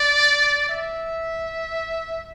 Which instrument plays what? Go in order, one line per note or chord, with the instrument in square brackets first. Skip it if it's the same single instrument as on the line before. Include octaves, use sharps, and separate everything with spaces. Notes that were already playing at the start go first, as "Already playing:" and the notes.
Already playing: [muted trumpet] D5
E5